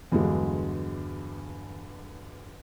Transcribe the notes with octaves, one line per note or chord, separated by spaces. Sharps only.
E2 G2 D3 F#3 G#3